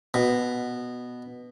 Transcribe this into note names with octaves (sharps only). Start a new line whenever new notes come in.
B2